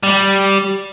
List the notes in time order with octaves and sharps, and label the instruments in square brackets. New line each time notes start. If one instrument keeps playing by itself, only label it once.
[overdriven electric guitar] G3